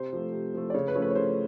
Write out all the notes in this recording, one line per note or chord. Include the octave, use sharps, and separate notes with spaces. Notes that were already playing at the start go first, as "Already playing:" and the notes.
Already playing: C3 C5
F3 A3
C3
F3 A3
D5
C#3 C#5
B4
F3 A3 C#4
B4
C#5
C#3 C5